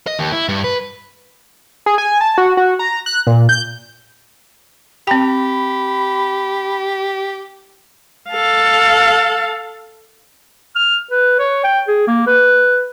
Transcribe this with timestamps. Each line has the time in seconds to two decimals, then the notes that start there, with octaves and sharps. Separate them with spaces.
0.07 D#5
0.19 D#2
0.32 E4
0.49 G2
0.64 B4
1.86 G#4
1.98 G#5
2.21 A5
2.38 F#4
2.57 F#4
2.79 A#5
3.06 F#6
3.27 A#2
3.49 G6
5.07 C4 G4 G5 B5
8.30 A4 F5
10.76 F6
11.11 B4
11.39 C#5
11.64 G5
11.88 G#4
12.08 A#3
12.27 B4